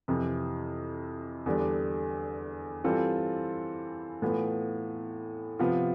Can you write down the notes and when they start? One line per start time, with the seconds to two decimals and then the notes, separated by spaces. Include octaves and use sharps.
0.08 F2 C3 E3
1.46 E2 D3 G3 D4
2.84 E3 G3 C4 F4 A4
4.22 A2 E3 B3 F4
5.59 C3 F3 B3 F4